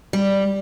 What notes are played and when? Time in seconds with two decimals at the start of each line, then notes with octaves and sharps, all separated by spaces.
0.13 G3